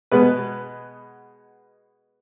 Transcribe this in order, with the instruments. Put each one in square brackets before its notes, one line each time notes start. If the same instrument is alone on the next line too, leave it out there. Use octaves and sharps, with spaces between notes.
[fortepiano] B2 G#3 B3 B4